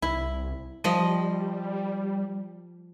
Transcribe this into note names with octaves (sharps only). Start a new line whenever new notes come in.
C2 E4
F3 G3 D#5